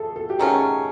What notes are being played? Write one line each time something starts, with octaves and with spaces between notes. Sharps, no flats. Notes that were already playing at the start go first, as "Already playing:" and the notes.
Already playing: A3 G#4 A4
A4
G4
D#3 F#3 A3 C#4 G#4